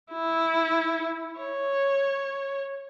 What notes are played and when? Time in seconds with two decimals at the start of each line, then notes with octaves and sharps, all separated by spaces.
0.12 E4
1.40 C#5